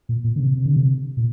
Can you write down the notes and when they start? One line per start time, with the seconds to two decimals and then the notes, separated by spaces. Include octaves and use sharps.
0.09 A#2
0.24 A#2
0.36 D3
0.40 C3
0.55 C3
0.66 D3
0.76 C3
1.17 A#2